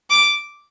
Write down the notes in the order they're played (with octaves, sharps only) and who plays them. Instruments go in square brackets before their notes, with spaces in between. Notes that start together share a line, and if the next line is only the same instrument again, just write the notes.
[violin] D6